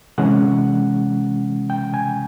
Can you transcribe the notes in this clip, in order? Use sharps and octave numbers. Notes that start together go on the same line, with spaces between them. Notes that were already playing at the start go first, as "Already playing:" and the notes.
C3 E3 G#3 C#4 F#5
G5
G#5